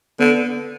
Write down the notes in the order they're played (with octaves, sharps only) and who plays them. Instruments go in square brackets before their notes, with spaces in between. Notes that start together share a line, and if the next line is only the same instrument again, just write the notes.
[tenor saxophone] D3 [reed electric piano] B3